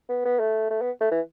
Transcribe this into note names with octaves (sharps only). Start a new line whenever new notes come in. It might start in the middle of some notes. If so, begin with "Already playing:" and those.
B3
B3
A3
A3
B3
A3
E3